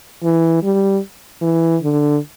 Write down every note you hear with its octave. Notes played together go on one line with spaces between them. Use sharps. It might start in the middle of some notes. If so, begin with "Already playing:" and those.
E3
G3
E3
D3